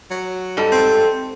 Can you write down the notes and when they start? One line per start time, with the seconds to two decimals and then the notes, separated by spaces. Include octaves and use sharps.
0.11 F#3
0.57 G#2 G3 A4
0.72 C4